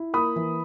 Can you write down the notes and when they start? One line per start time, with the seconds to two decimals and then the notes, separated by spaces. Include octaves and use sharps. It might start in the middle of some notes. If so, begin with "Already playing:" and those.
Already playing: E4
0.14 A#3 B5 D#6
0.36 E3